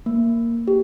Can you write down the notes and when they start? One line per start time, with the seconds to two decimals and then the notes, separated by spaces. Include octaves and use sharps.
0.06 A#3
0.68 G4